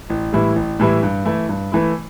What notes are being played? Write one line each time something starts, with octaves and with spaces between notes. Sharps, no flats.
A1
A2 E3 G3 E4
A1
A2 E3 G3 E4
G2
E3 A3 E4
G2
E3 A3 E4